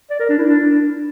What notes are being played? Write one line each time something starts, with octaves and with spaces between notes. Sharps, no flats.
D5
A#4
D4
E4
D4